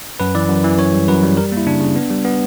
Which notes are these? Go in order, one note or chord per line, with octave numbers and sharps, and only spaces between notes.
F#2 B4
E3 D5
F#2
E3
F#2 C#5
G3
F#2 B4
G3
G3 A#4
A#3 E4
C#3 D4
C#3
B3
G3
B3